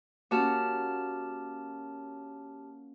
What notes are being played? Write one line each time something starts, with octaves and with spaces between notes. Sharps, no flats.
A#3 C#4 F#4 G4 A5 F6